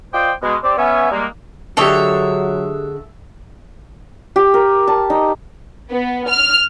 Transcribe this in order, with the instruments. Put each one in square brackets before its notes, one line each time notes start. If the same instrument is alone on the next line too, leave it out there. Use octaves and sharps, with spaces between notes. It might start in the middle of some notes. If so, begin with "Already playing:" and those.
[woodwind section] F4 C5 D5 D#5 G5
B2 G#3
C4 G4 D5
B3 C#4 E5 G#5
G3 G#3 A#3
[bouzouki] D3 G#3 [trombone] F#3 [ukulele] D4 G4 [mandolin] A4 C#5 E5
[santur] G4
A#4
A5
D#4
[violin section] B3
F6